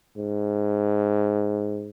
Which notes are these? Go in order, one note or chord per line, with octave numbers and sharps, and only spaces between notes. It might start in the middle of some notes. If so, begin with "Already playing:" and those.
G#2